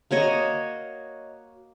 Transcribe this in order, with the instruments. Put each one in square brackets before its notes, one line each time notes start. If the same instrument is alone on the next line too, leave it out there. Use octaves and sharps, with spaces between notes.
[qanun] A#3 F#4 C#5 D#5